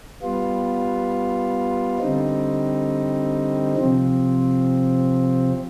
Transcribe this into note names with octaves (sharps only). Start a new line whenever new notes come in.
G3 B3 F4
D3 G3 C4 D#4
C3 F3 C4